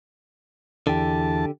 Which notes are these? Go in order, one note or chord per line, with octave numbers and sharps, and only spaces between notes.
E2 D3 G4 A5